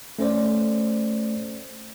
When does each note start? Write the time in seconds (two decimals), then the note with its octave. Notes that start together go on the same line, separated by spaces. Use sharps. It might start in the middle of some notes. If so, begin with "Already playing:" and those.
0.19 A3 C#4 C5 D5